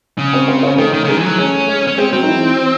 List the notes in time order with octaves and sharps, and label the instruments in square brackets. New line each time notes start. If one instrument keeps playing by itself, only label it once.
[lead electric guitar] C#3
[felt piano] C4 C5
C4 C5
C#4 C#5
[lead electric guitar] D#3 [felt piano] A3 A4
[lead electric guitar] D#3
C#3
[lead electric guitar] D#3 [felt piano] G#3 G#4
[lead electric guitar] E3
F#3
[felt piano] A3 A4 [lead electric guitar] C#4
[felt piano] G#3 G#4
[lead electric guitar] C#4
[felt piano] G#3 G#4 [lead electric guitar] C4
[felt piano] F#3 F#4 [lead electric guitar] C4
[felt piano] D#4
E3 E4